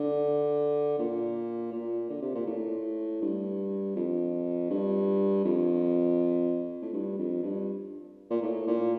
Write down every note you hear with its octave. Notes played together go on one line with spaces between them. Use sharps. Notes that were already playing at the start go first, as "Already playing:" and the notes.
Already playing: D3
A#2
A#2
D3
C3
A#2
A2
G2
F2
G2
F2
A2
G2
F2
G2
A#2
A2
A#2